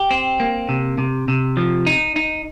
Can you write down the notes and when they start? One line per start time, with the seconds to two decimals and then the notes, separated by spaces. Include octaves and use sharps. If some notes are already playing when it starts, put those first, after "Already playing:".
Already playing: G4
0.11 C4
0.40 A#3
0.69 C3
0.98 C3
1.28 C3
1.57 F3
1.86 D#4
2.16 D#4